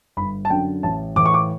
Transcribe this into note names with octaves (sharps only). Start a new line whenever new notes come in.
G1 B5
A5
F#2 D3 G5
A1 A5
A2 E3 D6
C#6
D6